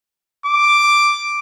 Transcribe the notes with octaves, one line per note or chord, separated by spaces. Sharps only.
D6